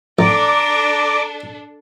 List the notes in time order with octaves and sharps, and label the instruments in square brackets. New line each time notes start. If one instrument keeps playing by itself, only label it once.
[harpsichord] A1 [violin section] D4 A4 [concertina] D5 A#5 [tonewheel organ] D6